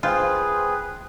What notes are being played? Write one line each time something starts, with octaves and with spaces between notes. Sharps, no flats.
F4 G#4 B4 C5 G5